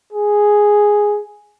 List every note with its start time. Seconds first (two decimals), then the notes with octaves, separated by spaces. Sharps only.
0.13 G#4